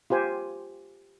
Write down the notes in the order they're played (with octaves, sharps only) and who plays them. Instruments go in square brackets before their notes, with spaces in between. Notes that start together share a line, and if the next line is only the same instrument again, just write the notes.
[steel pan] F4 G4 C5 G#5